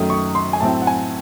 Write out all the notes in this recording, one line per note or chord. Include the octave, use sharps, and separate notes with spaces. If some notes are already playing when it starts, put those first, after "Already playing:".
Already playing: F#2 D#3 F#3 A3 D#6
C#6
C6
G#5
A2 F#3 C4 E4 A5
F#5
G#5